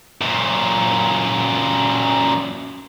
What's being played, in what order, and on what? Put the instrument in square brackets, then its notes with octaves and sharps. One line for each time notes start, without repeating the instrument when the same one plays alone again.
[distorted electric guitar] F#2 A#2